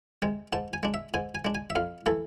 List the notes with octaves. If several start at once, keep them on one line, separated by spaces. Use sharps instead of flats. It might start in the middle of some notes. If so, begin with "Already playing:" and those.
C3 G#3
G#2 A5
G#5
G#3 D4
E5
G#2 G#5
G#5
G#3 D4
G#5
E5
F2 F5
E3 A3 A4